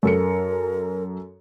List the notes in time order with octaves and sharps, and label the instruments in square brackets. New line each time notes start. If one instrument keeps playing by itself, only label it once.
[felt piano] F#2 A4 C#7 [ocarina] A#4